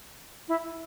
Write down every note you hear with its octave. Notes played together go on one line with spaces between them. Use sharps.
E4